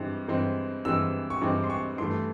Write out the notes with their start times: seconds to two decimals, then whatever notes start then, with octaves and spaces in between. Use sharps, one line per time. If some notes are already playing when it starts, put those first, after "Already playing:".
Already playing: G2 E3 G#3 C4
0.28 G2 E3 G#3 C4
0.85 G2 E3 G#3 C4 E6
1.30 C#6
1.42 G2 E3 G#3 C4 D6
1.64 C6
1.70 C#6
1.98 G2 E3 A3 C6